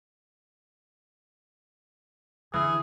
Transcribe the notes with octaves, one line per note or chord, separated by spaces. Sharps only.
D3 E3 G#4